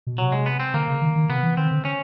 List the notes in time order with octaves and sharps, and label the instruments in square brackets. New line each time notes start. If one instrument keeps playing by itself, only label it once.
[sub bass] B2
[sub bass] C3 [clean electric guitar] F#3
[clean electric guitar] G#3
B3
C4
[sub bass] D3 [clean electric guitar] A#3
[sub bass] C#3
D#3
D#3
[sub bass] C3 [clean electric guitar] B3
[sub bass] E3
[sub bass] D#3 [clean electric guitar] C4
[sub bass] D3
[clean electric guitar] C#4